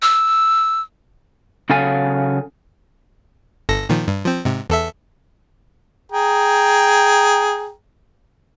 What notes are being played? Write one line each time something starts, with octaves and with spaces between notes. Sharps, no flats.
E6
C#3 F#3 A4 F5 G#5
G1 A4 A#6
A#2 D#3 F3
G2
F3 C4
G#2 C3
E2 A4 E5
G#4 G5 A#5